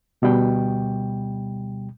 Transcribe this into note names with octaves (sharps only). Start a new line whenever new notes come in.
D2 B2 G3 G5